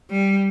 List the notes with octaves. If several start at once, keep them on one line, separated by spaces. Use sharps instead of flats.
G3